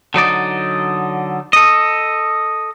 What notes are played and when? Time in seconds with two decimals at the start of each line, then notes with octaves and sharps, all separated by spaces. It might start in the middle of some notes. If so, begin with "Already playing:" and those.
0.14 D3 F#3 D#4 D5
1.53 A4 D#5